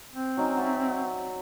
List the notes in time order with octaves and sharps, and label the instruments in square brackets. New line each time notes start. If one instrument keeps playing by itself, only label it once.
[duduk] C4
[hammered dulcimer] F#3 C#4 D#4
F#4 D5 E5